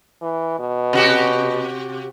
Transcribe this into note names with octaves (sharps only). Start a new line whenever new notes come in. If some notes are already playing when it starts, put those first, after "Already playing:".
E3
B2
C3 F#4 G4